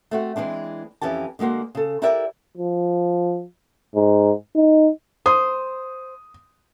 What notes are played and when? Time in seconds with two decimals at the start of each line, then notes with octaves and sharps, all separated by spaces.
0.11 A3 C4 F#4
0.36 E3 G#3 C4 D4
1.01 F2 E3 C#4 G4 A5
1.39 D3 G#3 A#3 F#4 C5
1.75 C#3 A4
2.02 E4 G4 A#4 B4 D5 E5
2.57 F3
3.95 G#2
4.56 D#4
5.26 C5 D#6